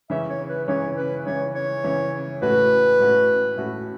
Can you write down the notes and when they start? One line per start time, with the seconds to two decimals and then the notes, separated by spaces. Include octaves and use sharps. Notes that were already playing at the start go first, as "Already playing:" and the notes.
0.10 C#3 E3 C#4 E5
0.30 C#5
0.48 B4
0.68 C#3 E3 C#4 C#5
0.97 B4
1.26 C#3 E3 C#4 C#5
1.55 C#5
1.84 C#3 E3 C#4
2.42 A2 A3 C#4 F#4 B4
3.00 A2 A3 C#4 F#4
3.57 A2 A3 C#4 F#4